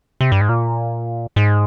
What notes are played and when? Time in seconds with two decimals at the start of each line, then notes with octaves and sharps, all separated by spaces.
0.21 C3
0.32 G2
0.41 G#2
0.49 A#2
1.36 G#2